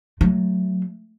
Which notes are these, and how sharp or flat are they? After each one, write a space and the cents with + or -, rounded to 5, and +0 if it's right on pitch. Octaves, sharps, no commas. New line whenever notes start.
F#3 +0 A3 +0